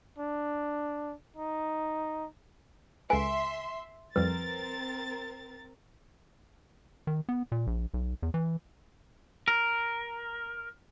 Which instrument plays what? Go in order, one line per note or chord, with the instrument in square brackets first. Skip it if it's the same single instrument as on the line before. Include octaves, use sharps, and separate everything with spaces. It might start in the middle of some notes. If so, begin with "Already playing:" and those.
[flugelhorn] D4
D#4
[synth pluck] C#2 A4 B4 [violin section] E5 C6 [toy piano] G#5
[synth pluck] F2 G3 [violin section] C4 A#4 A6 [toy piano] B4
[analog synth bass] D#3
B3
A#2
A#1
B1
E2
E3
[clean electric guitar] A#4